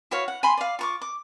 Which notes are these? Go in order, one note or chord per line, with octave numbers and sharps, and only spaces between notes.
E4 F#4 C#5 F5
F#5
G#5 B5 C6
D5 F5
F4 C#6 D6
D6